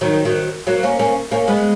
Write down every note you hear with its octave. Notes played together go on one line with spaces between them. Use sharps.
D#3 F#3
D#3 F#3
F#3 A#3
A#3 C#4
A#3 C#4
A#3 C#4
G#3 B3